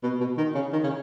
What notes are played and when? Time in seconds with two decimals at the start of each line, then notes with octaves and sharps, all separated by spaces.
0.03 B2
0.20 B2
0.38 D#3
0.55 C#3
0.73 D#3
0.84 C#3